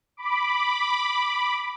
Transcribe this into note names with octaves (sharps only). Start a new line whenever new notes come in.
B5 D6